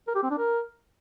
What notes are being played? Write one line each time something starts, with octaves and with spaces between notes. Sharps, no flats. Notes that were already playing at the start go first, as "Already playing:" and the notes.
A#4
G4
C4
D4
A#4